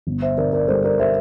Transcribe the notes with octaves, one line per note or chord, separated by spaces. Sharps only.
G1
C5 E5
D3 A#4 D5
A#4 D5
G3 A4 C5
A#4 D5
G3 C5 E5